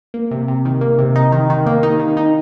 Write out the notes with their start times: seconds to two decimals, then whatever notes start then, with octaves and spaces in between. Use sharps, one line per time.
0.14 A#3
0.31 C3
0.48 C3
0.65 D#3
0.81 A#3
0.99 C3
1.16 D#4
1.32 D#3
1.50 D#3
1.66 A#3
1.83 D#4
1.99 D#3
2.17 D#4